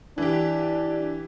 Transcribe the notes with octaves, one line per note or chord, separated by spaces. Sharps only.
E3 D4 G4